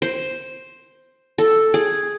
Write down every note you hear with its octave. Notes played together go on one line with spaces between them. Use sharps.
C5
A4
G#4